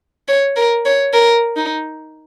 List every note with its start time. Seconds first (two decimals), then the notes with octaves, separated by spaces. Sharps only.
0.28 C#5
0.56 A#4
0.85 C#5
1.13 A#4
1.56 D#4